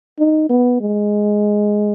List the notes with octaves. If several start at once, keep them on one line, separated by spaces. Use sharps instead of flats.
D#4
B3
G#3